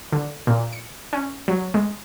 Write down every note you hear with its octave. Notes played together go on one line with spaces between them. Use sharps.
D3
A#2
C#7
C#4
F#3
G#3